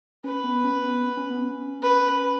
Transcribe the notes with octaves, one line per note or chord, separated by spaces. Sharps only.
C#4 B4
B3
C#4
B3
C#4
B3
C#4
B4